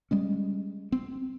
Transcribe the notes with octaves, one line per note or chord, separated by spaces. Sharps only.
G3 G#3 C#4
C4